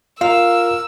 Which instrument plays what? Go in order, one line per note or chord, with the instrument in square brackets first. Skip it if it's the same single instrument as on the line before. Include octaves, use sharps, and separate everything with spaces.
[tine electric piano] F4 [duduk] A#4 [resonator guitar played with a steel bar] F5 [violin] E6